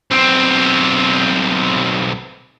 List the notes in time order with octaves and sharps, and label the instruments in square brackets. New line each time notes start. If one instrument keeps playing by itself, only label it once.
[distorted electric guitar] B1 C4